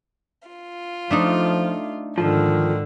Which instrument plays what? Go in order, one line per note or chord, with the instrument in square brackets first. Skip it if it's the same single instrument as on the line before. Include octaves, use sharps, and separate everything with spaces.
[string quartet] F4
[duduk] F3 [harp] A3 D4 D#4
[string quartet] G#2 D3 [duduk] D#3 [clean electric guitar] F3